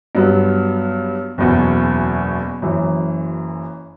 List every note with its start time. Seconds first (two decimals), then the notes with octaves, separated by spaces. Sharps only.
0.15 G2 F#3 B3
1.38 F#1 E2 B2
2.62 F#1 F#2 E3